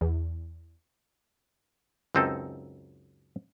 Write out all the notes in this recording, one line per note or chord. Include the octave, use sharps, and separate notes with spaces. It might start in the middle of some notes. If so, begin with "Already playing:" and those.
E2
C#2 F#2 C4 D#4 A4